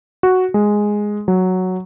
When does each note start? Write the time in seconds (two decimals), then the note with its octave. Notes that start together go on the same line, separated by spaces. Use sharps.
0.23 F#4
0.54 G#3
1.28 F#3